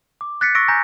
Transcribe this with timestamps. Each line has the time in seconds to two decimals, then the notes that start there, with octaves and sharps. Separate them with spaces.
0.21 D6
0.41 F#6 A6 B6 C#7
0.55 C#6 E6 A#6 D7
0.68 G#5 A#5 G6 A#6